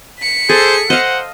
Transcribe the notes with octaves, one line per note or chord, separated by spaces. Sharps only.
B6 C#7
G#4 A4 C5
C5 D#5 F5 F#5